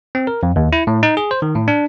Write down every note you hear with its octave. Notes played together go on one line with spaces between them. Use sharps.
C4
A#4
F2
D#2
E4
A2
D#4
G#4
C5
D#3
A2
D4